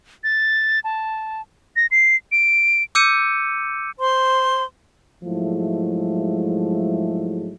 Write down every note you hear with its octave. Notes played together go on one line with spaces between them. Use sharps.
A6
A5
A#6
C7
D7
D6 E6 G6 C#7 D#7
C5 C6
G#2 F3 F#3 G#3 A3 E4